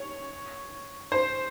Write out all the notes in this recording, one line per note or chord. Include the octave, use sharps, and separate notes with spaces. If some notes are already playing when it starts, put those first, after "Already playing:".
Already playing: C#5
C5